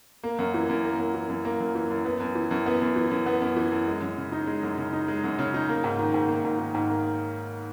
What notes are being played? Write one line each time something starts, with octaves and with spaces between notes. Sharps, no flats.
A#3
F#2
E3
F#2
A#3
F#2
E3
F#2
A#3
F#2
E3
F#2
B3
F#2
E3
F#2
B3
F#2
E3
F#2
B3
F#2
E3
F#2
G#3
F#2
C#3
D#4
G#3
F#2
C#3
D#4
G#3
F#2
C#3
D#4
A#3
G#2
D#3
G#2
A#3
G#2
D#3
G#2
A#3